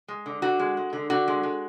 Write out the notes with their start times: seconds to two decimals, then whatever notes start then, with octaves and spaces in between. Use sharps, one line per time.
0.08 G#3
0.26 D3
0.42 D3 F#4
0.60 G#3
0.77 G#3
0.93 D3
1.10 D3 F#4
1.28 G#3
1.43 G#3